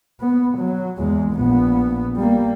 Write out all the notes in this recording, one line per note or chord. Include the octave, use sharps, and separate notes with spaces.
B3
F#3
E2 G#3
A#1 B3
G3 A#3